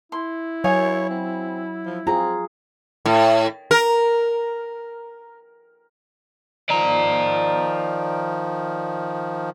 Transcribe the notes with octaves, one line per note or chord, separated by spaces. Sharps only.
E4 C6
F#3 C#5 F5 G#5 D#6
C4
F3
C4 F4 G#4 A#5
A2
A#4
D#3 F3 D5 A#5